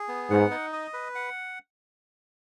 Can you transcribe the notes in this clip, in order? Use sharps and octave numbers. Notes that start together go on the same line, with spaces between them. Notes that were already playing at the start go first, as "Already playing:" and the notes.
Already playing: G#4
B3
G#2 F#5
D#4
D#5
B4
F#5